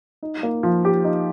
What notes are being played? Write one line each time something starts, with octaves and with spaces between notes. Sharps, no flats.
D#4
A#3
F3
G4
D#4